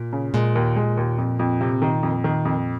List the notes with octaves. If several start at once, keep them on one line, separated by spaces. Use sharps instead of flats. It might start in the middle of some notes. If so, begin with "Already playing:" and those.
Already playing: A#2
C#3
A#2 G#3
D#2
G#3
D#2
F2
F2
C3
D#3
F2
D#3
F2